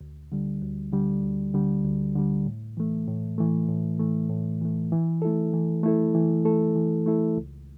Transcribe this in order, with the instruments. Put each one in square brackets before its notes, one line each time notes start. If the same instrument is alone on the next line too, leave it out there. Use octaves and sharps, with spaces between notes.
[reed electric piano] D2
D3 G3
D2
D3 G3
D2
D3 G3
D2
D3 G3
A2
E3 A3
A2
E3 A3
A2
E3 A3
A2
E3 A3
E3
A3 E4 A4
E3
A3 E4 A4
E3
A3 E4 A4
E3
A3 E4 A4
C#2